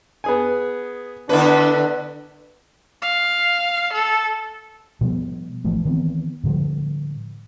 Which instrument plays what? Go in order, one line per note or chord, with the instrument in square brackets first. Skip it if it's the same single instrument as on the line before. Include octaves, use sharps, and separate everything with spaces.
[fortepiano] B3 G#4 G#5
[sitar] D3 E4 B4 [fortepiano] B3 [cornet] D4
[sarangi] F5
A4
[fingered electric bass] B2 F3 G3 B3
A1 E3 F3 A3
D#3 E3 B3 C4
A2 D3 F3 G3